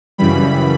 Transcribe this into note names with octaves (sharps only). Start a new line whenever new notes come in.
F#2 C#3 E3 G3 B5